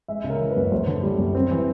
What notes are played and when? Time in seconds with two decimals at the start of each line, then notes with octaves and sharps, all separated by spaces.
0.08 G#3 E5
0.24 C#3
0.30 A#4
0.40 E3
0.51 B4
0.57 F#2
0.72 F#2 C5
0.87 D3
1.03 G3
1.18 F#2
1.35 C4
1.51 E3